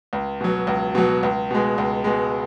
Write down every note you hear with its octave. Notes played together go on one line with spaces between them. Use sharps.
C#2
B2 F#3
C#2
B2 F#3
C#2
B2 G#3
C#2
B2 G#3